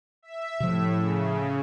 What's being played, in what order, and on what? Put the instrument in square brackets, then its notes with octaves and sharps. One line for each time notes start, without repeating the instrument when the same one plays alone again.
[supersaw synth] E5
[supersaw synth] A2 [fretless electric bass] C3 F3
[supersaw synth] C#3